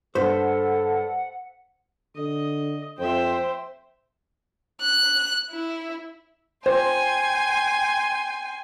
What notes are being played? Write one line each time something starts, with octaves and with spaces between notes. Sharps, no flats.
G2 A4 C5 F#5 B6
D3 D#5
F2 C5 E5 G5
F#6
E4
C5 G5 G#5 C6